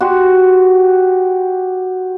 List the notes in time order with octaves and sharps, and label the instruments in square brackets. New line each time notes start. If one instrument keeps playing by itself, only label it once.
[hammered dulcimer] F#4 G4 C6